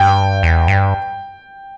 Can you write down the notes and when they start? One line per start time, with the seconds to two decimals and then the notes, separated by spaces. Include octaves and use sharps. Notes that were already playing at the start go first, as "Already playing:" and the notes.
Already playing: G2 G5
0.43 E2
0.68 G2